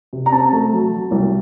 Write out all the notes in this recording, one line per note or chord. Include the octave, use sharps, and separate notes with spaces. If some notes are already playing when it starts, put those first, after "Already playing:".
C3
A#5
C4 A5
A3
F#3
F#3
C2